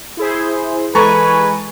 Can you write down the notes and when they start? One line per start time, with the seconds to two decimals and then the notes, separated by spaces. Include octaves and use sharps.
0.17 E4 G#4 C5
0.95 E3 G#3 A4 B4 G#5 A#5 C#6